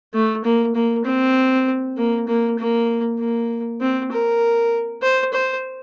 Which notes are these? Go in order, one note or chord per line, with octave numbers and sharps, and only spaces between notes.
A3
A#3
A#3
C4
A#3
A#3
A#3
A#3
C4
A#4
C5
C5